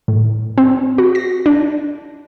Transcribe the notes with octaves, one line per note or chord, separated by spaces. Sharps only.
A2
C4
F#4
A#6
D4